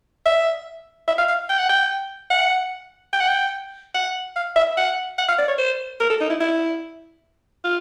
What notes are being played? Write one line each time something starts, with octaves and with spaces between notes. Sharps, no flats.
E5
E5
F5
F5
G5
F#5
G5
F#5
G5
F#5
G5
F#5
F5
E5
F#5
F#5
F5
D5
C#5
C5
A#4
A4
D#4
E4
E4
F4